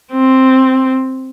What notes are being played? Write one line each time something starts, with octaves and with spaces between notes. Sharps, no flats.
C4